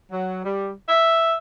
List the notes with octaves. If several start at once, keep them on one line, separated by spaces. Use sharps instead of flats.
F#3
G3
E5